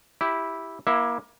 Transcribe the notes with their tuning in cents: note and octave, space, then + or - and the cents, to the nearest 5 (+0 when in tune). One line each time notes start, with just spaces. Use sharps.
E4 -5 G4 +0
A#3 +25 E4 +0 E5 +0